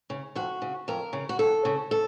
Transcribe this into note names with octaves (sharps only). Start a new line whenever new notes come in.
C#3
F2 F#4
C#3
F2 A#4
C#3
F#4
F2 A4
C#3
A4